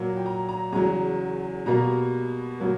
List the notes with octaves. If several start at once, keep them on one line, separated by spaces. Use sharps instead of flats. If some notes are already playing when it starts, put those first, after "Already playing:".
Already playing: A#2 F#3 A#3
G5
A#5
A#5
E2 C#3 F#3 A#5
B2 G3 A#3 A#5
F#3 A#3